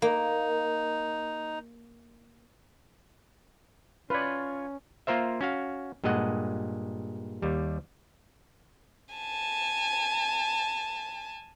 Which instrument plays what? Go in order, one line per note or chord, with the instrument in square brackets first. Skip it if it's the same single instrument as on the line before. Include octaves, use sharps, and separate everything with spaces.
[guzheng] A#3 [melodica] D#4
[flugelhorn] C#4 [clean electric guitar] F4 C#5 [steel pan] B4 D5
[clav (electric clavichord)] A#3 F4 A#4 C5 E5
C#4 F#4 F5
G2 A#2 G#3 D#5 F#5
D#2 G3
[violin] G#5 A5